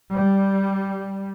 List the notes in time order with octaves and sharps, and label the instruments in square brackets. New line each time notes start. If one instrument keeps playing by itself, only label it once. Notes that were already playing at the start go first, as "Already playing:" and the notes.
[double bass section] G3